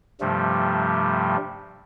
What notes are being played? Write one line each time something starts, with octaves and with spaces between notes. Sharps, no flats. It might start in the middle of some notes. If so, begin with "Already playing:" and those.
G2 C3 F3 G3 A3